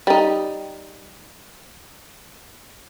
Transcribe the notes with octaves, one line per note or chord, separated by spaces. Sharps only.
G3 D#4